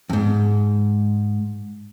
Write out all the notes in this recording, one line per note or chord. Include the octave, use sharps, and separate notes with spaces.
F2 G#2